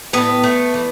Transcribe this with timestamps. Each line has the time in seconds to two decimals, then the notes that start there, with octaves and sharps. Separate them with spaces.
0.13 A2 B3 B4
0.43 A3
0.74 E3